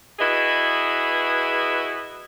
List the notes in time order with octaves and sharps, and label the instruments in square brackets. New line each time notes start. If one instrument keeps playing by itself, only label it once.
[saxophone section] E4 F#4 G#4 B4 D#5